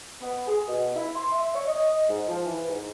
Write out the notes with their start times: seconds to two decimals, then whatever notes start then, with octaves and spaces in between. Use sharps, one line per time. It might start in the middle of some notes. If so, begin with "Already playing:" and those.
0.21 B3
0.48 G#4
0.68 B2
0.96 E4
1.16 C6
1.32 E5
1.55 C#5
1.68 D#5
2.09 G#2
2.28 F3
2.45 E3
2.70 G#2